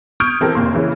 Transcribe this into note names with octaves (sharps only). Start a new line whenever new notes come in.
C#6 D#6 F6 G6 G#6 D7
E3 C4 G4 A4 A#4
F1 D#2 A#3 C6
C#3 E3 A#3 C#4